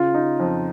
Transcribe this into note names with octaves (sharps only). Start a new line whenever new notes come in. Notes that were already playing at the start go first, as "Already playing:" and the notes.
Already playing: C#3 F4
D#4
F2